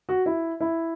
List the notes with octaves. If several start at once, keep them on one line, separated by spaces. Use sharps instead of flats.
F#4
E4
E4